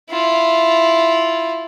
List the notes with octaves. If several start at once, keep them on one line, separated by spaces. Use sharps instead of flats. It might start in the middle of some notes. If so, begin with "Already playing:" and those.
E4 F4